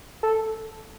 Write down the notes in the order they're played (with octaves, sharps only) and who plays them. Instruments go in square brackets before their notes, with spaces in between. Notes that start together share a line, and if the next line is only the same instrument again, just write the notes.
[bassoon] A4